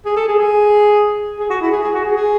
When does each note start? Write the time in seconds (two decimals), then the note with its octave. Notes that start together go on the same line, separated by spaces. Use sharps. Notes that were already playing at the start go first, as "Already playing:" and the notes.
0.05 G#4
0.16 A4
0.28 G#4
0.39 G#4
1.39 G#4
1.50 F#4
1.61 E4
1.71 G#4
1.83 G#4
1.94 F#4
2.05 G#4
2.16 G#4